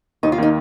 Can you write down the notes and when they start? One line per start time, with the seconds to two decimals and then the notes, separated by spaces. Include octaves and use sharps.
0.23 D#2 D#4
0.32 F4
0.38 D#3 A#3 D#4